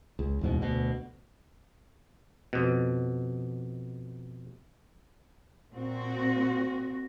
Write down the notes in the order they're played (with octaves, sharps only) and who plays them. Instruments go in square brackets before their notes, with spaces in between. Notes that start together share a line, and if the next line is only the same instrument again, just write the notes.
[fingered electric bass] C#2
D1 E2 G#2 B2
D2 B2
[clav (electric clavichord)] F2 B2
[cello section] A#2 C4 F#4